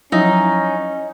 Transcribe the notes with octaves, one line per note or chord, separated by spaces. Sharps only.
F3 F#3 C#4 D#4 E4